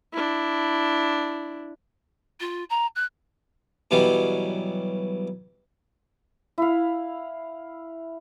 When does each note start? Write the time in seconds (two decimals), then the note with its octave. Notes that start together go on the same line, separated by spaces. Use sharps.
0.13 D4 E4
2.40 F4
2.70 A#5
2.96 F#6
3.91 B2 E3 F#3 G3
6.58 E4 F5